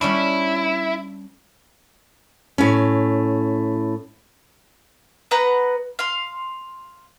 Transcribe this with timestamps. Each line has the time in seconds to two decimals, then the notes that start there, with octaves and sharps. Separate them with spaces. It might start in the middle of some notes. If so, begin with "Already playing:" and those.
0.01 G3 C#4 D4 E4
2.58 A2 C#4
5.31 B3 B4 F#5 A#5
5.99 F5 C6